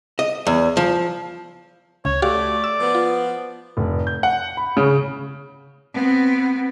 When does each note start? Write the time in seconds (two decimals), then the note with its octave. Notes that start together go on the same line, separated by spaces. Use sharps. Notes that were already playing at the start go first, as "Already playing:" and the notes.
0.19 D#5
0.47 E2
0.77 F3
2.05 C#2 C#5
2.22 A3 F#4 G4 D5 F5
2.64 E6
2.80 F3 B3
2.95 F4
3.77 F1
4.07 G6
4.23 F#5
4.57 B5
4.77 C#3
5.93 B3 C4